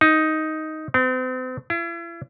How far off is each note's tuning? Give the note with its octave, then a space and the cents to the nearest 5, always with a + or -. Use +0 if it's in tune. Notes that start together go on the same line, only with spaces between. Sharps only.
D#4 +5
C4 -40
E4 +40